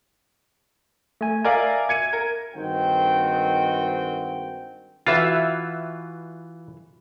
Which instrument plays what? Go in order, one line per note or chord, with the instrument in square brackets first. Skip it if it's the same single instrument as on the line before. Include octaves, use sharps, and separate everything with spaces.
[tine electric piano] A3 G#5
[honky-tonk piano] A#4 D5 F5 [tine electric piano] E5 G#5
[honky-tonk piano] G#6 C#7 D#7
A#4
[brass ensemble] G2 D#3 G#3 C4 F#4 G5
[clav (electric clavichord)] E3 F4 [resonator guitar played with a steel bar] F#4 B4 E5